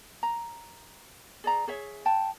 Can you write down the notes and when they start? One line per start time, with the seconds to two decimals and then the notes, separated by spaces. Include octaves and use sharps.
0.23 A#5
1.44 G#4 D5 A#5
1.68 G#4 C#5 E5
2.05 G5 A5